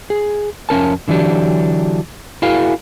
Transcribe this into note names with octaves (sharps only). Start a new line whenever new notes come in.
G#4
F2 C#4 A#4 A5
D3 E3 F#3 D4 G4
E4 F#4 G#4 A#4 F5